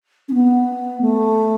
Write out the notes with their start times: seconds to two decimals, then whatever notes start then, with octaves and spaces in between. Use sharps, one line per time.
0.29 C#4
0.34 B3
1.01 A3